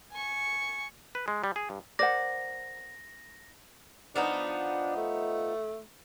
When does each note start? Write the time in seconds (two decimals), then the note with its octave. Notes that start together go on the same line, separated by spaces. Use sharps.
0.12 G#5 C#6
1.15 B4
1.28 G#3
1.44 G3
1.56 G#4
1.70 G2
1.99 A#4 C5 D5 F#5 A#6
4.16 F3 B3 D4 D#4
4.96 A3